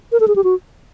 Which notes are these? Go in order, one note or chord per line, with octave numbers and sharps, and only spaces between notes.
A#4
A4
G#4
G4
F#4